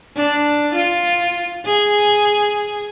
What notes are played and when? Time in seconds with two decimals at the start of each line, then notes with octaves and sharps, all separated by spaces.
0.16 D4
0.75 F4
1.66 G#4